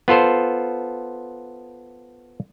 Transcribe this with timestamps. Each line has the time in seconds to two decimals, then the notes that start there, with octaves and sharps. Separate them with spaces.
0.08 B3 F4 A4 C5